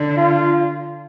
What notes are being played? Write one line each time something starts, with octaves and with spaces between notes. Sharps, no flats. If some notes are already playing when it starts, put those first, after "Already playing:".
Already playing: D3
F4